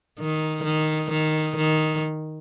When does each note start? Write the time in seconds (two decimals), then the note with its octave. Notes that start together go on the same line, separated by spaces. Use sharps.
0.19 D#3
0.64 D#3
1.11 D#3
1.57 D#3